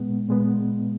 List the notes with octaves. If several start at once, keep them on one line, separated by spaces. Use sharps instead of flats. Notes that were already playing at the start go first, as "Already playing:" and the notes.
Already playing: A#2 G#3 B3
A#2 G#3 B3